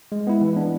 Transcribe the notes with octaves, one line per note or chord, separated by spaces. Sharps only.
G#3
B3 E4
E3
B3 D4